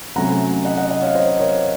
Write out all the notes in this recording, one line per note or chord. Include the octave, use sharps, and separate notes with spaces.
C3 F#3 A3 C#4 F#5 A#5
D#5 F#5
D#5 F#5
D#5 F#5
C#5 F5
C5 D#5
A#4 C#5